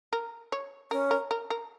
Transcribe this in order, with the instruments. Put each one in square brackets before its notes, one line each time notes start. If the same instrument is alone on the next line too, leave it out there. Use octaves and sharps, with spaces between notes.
[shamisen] A#4
C#5
[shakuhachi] C#4 [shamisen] A#4
[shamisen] A#4
A#4
A#4